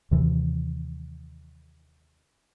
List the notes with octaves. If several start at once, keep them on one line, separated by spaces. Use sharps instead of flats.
D#2 C3 E3